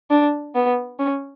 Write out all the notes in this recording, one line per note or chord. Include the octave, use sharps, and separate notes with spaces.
D4
B3
C#4